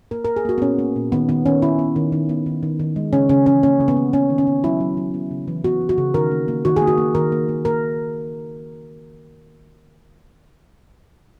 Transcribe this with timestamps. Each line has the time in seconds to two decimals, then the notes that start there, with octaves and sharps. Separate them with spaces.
0.11 A#3 A#4
0.25 A#4
0.28 A#3
0.36 G#4
0.45 A#3 F#4
0.58 B3
0.62 A#2 C#4
0.79 A#3
0.96 A#2
1.12 D#3 B3
1.29 D#3 B3
1.46 D#3 C#4
1.62 D#3 E4
1.79 B3
1.96 D#3
2.12 D#3
2.29 B3
2.46 D#3
2.63 D#3
2.80 D#3
2.96 G#3
3.13 C#3 C#4
3.29 C#3 C#4
3.46 E3 C#4
3.63 A#3 C#4
3.80 C#3
3.88 B3
3.97 A#3
4.13 B3 C#4
4.30 D#3
4.38 C#4
4.47 B3
4.63 F#3 E4
4.80 F#3
4.97 F#3
5.14 B3
5.31 C#3
5.48 E3
5.64 B3 F#4
5.81 E3
5.89 F#4
5.98 C#3
6.14 D#3 A#4
6.31 A#3
6.48 A#3
6.65 D#3 F#4
6.76 G#4
6.81 A#3
6.87 F#4
6.98 A#3
7.15 D#3 A#4
7.32 A#3
7.49 A#3
7.65 A#3 A#4